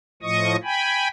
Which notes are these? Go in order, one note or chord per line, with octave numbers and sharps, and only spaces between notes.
A2 F3 D#5 C#6 D#6
G5 G#5 B5